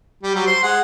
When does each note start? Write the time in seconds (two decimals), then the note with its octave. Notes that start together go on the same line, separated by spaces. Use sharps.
0.23 G3
0.35 F#3 G3
0.47 C5 C6
0.63 G#3 F#5